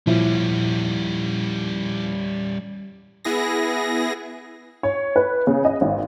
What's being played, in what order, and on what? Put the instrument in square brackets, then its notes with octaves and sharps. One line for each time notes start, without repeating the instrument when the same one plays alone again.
[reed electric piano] A#2 F3 E4 [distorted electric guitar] G3 C#4
[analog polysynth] B3 E4 G#4 A#6
[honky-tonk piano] C#5
B4
C#3
D#5
G#1